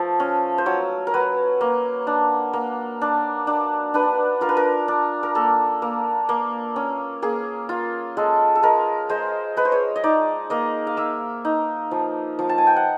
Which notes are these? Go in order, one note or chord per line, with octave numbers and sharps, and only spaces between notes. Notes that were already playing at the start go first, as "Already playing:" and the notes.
Already playing: F3 A3
C#4
C5
F#3 C#5
A#4
F#3 B4
A#3
D4
A#3
D4
D4
D4 B4
F4 A#4
B4
A#4
D4
A#4
A#3 A4
A#3
A#3
C#4
A#3 G#4
F4
G#3 A4
A4
G#3 A#4
G#3 C5
G#3 B4
C5
C#5
D#5
D#4 D5
A#3 D#5
F5
A#3 E5
D#4
F3
F3
A5
G#5
G5
F#5